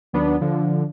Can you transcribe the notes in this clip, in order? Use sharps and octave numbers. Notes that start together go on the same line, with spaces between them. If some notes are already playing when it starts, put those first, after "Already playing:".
D#2 F#3 B3 D4
D3 F3